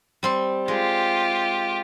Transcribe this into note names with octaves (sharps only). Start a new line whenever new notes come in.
G3 C4 C6
G#3 F4 G4